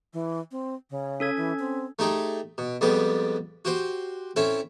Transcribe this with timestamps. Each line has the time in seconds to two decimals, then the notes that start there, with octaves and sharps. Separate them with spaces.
0.13 E3
0.51 C4
0.90 C#3
1.20 C#4 A4 G#6
1.37 E3
1.59 C4
1.99 A3 D#4 G4 G#4
2.58 B2
2.81 F2 G3 G#3 B3 D5
3.65 F#4 G4 C5
4.36 C4 C#4 E4 A4